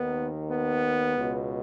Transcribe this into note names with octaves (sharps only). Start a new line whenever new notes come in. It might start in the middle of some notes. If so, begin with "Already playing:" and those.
Already playing: D#2 D#3 B3
B3
C#2 B2